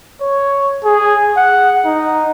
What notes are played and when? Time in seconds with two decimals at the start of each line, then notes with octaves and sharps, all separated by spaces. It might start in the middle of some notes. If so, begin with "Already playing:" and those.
0.21 C#5
0.85 G#4
1.37 F#5
1.85 D#4